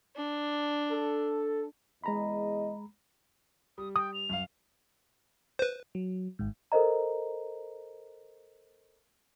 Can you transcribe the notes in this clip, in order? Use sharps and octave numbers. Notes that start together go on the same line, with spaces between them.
D4
A4
E2 G#3 G#4 D#5 A#5 B5
G3 D#6
G5 D#6
F7
F#2 F5
B4 C5
F#3
G#1 G#2
A4 A#4 C5 D#5 A#5